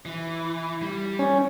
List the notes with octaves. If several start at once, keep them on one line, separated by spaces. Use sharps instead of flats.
E3
G3
C#4